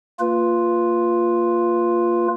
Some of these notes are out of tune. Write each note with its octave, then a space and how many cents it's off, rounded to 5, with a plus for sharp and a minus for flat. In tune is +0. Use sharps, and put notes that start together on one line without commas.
A#3 -20 F4 +0 B4 -5